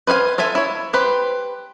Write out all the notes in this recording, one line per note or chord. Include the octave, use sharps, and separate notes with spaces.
B4 C5 F5 G#5
F4 A4 E5 G#5
E4 C#5
G4 B4 C5